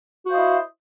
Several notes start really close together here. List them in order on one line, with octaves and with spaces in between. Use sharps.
F#4 C5 F5 D#5 E4